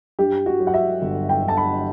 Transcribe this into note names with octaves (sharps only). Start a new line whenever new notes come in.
G2 G4
F#4
F#3
F#5
E5
G1
G5
D3 A5
B5